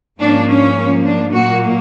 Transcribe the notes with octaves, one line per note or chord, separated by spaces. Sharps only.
G#2 F3 A#3 C#4 D4
C#4
D4
A#2 F#3 A#3 F#4